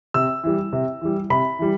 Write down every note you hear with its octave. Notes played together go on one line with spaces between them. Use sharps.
C3 E6
E3 G3
C3
E3 G3
C3 B5
E3 G3